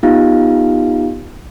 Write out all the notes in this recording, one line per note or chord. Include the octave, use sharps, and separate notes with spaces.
B3 D#4 F4 G4 F5